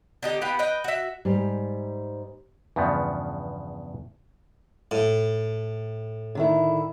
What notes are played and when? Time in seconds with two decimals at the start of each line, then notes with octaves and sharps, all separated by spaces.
0.23 D3 D#4 G4
0.41 B3 G4 F5 F#5
0.59 B4 D#5 G5
0.84 F#4 E5
1.25 G#2 G3
2.76 E2 G2 C#3 F3 B3
4.91 A2
6.35 D3 D#3 E4